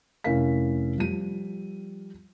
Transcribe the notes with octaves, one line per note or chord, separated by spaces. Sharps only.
F1 C#4 E4 A#4 F5 B6
F3 G3 D#7